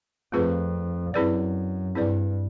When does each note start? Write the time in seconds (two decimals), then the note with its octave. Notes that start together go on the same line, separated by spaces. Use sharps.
0.32 F2 A3 C4 F4 G#4 B4
1.14 F#2 C4 E4 G#4 B4 D5
1.95 G2 C4 E4 G#4 B4 D5